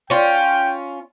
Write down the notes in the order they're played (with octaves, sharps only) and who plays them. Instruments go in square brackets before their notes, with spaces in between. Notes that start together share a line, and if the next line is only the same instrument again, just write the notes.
[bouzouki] C#4 F4 [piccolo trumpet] G5